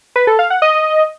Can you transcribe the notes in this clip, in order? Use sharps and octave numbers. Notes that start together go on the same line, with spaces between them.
B4
A4
F5
F#5
D#5